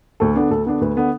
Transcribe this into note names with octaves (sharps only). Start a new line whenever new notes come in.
D2 A4
D3 B3 D4
D2 A4
D3 B3 D4
D2 B4
D3 B3 D4